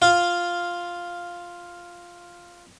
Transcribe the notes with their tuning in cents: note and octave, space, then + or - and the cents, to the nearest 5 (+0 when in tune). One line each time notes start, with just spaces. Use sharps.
F4 +0 F5 +0